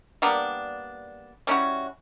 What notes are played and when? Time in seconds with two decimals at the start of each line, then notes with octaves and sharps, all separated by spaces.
0.22 G3 A#3 B3 D4
1.47 G3 C#4 E4 F#4